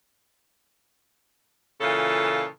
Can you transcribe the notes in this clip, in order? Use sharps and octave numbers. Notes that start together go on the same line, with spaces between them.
A#2 C#3 E3 F4 A4